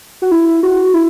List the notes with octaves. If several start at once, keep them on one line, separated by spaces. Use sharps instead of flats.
F#4
E4
F#4
E4